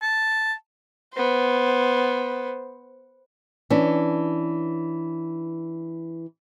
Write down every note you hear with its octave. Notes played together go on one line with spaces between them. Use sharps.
A5
B3 C5
E3 C#4 D4